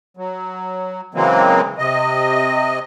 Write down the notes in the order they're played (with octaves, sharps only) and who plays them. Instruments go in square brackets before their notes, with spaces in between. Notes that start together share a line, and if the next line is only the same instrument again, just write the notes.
[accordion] F#3
C#3 E3 F#3 G#3 A#3 C4
C3 D#5